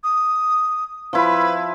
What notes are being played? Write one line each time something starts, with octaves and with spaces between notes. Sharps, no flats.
D#6
F3 E4 B4